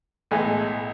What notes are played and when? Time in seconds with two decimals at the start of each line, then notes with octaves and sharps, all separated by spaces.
0.31 B1 A2 E3 G#3